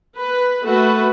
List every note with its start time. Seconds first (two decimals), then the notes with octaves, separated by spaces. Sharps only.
0.16 B4
0.63 A3 F#4 B4